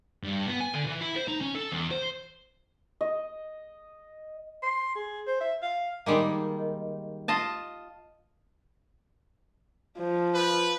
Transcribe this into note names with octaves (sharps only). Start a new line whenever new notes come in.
G2
B3
G#5
D3
E3
E4
C5
D#4
C#4
A4
E2
C5
D#5
C6
G#4
C5
E5
F5
D#3 G3 G#3 A#3
F4 D#5 A5
F3
B4